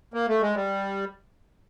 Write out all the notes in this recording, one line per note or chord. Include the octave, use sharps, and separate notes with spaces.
A#3
A3
G#3
G3